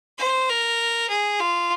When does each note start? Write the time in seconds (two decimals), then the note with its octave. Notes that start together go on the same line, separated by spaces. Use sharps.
0.18 C5
0.49 A#4
1.09 G#4
1.40 F4